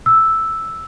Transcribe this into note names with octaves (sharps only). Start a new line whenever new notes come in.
E6